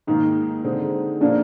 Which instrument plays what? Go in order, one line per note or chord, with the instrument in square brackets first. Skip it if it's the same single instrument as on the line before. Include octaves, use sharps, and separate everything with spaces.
[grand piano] G#2 D#3 A#3 [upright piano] D#4
[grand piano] D3 G#3 C4
[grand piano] A#2 F3 A#3 [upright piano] D4